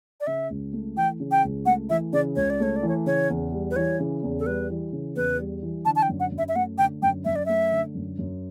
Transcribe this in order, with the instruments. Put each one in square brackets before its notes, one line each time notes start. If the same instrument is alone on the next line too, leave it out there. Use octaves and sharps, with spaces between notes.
[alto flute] D5
[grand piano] C#3 [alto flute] E5
[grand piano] C#2
A3
[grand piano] E3 [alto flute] G5
[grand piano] C#3
[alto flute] G5
[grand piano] C#2
[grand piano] A3 [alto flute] F#5
[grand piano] E3 [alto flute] E5
[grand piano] C#3 [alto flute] D5
[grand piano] C#2 [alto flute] C#5
[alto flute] D5
[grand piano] A3 [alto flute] C#5
[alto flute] D5
[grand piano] E3
[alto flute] C#5
[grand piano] C#3 [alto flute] C#5
[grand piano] E2
G3
[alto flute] B4
[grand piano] E3 [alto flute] C#5
[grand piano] C#3
E2
[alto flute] A4
[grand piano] G3 [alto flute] B4
[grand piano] E3
C#3
[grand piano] E2 [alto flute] B4
[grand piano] G3
E3
[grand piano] D3 [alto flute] A5
[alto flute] A5
G5
[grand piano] F#2
[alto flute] F#5
[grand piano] F#2
[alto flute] E5
E5
[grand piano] A3 [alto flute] F#5
[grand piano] D3 [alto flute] G5
[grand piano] F#2 [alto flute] G5
[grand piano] F#2 [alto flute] E5
[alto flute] D5
[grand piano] A3 [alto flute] E5
[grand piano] D3
F#2
F#2